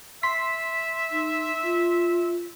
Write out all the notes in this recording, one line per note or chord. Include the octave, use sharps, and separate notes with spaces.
E5 C6 B6
D#4
F4